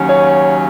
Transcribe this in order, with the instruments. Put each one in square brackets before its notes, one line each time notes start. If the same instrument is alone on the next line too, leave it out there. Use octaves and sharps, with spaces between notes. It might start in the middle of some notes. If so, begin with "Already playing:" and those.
Already playing: [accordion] D#2 C#3 F#3 C#4
[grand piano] C#5